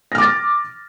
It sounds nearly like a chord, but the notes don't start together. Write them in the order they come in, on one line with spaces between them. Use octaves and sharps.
A#6 F6 D6 A6